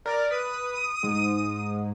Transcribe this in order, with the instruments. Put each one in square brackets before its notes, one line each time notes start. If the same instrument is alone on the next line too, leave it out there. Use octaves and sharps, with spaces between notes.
[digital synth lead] A#4 [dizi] D5
[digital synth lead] B4 [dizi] D#6
[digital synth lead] G#2